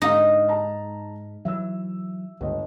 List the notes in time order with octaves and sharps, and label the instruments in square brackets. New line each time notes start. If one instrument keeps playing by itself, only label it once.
[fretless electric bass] G#2 [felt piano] D3 C4 F5 [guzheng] D#4
[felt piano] A5 A#5
[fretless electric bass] E3 F#3 [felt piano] E5 E6
[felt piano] G1 D#5 [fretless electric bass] C#2